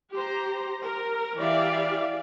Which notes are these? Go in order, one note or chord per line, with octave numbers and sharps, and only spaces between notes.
G4 C5 A#5
A#4
E3 G4 D5 E5 F5